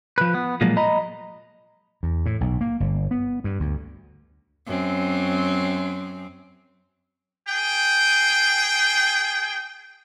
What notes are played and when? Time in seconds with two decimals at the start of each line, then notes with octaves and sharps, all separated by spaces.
0.18 F3 B4
0.35 B3
0.61 A#2 F3 F#3 G#3 A#3
0.77 D#5 A#5 B5
2.03 E2
2.26 A2
2.41 B1
2.61 A#3
2.80 G1
3.11 B3
3.44 G2
3.60 D2
4.67 F#2 C4
7.47 G#4 G5